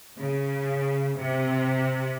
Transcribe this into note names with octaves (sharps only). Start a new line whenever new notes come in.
C#3
C3